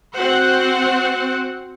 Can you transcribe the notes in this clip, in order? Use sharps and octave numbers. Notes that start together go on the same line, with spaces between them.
C4 F#4 C5 F#5